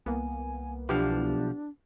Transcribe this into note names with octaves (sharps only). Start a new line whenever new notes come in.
C2 A#3 B3 G#5
B1 F3 B3 D4 E4 G4